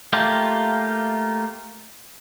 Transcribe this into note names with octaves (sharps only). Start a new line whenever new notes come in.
A3 A#3 F4 G4